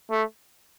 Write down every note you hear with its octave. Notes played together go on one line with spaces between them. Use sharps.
A3